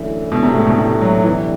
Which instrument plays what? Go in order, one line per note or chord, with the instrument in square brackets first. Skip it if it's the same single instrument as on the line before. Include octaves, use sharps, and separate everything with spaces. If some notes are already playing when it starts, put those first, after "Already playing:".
Already playing: [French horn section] F#2 D3 A3 E4 [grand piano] E3
[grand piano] B2
C3
A2
B2
C3
F#3
[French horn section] D3 G3 B3 E4 [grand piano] E3